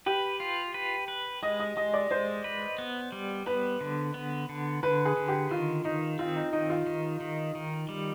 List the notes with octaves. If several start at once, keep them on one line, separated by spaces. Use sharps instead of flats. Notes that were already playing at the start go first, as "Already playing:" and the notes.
G4 B4
F4
B4
B4
G#3 D#5
D#5
G#3 D#5
D5
G#3 C5
B4
B3
G3
B3 B4
D3
B3
D3
D3 B4
G#4
D3
G4
D#3 F4
D#3 D#4
C4 F4
D#4
D#3 D#4
F4
D#3
D#3
D#3
G3